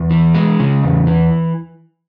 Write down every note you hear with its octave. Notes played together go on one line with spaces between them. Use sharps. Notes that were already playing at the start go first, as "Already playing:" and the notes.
Already playing: E2
E3
G#3
C#3
E2
E3